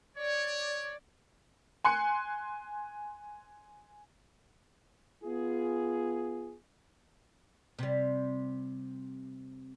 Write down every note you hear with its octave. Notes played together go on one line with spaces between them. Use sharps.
C#5 D5
G#5 C6 F#6 C#7
B3 F4 G#4
C3 G3